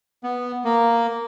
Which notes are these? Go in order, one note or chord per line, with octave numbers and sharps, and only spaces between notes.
B3
A#3